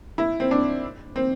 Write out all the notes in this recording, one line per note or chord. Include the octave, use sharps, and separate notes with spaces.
E4
C4
D4
C4